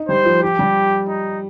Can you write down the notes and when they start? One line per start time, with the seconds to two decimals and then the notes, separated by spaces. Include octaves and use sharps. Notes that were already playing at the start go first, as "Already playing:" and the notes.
Already playing: D#4
0.09 G3 C5
0.25 F3
0.42 F3 G4
0.59 G3
1.09 D#4